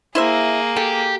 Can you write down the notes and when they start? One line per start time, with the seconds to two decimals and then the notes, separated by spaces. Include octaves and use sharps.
0.15 A#3 E4 G#4 C5 E5
0.76 G4 A4